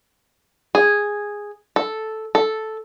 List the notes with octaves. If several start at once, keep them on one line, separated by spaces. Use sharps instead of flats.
G#4
A4
A4